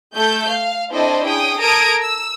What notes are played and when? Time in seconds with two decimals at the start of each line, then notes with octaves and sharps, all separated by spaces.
0.15 A3 A4 G6
0.49 F5
0.92 C4 D4 E4 A4 C5 D#5
1.25 C#4 G#4 G5 D#6
1.58 A4 A#4 A#5 D#6 G#6 D7
2.00 E6